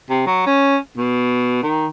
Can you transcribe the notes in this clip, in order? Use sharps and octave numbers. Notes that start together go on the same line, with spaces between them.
C3
F#3
C#4
B2
D#3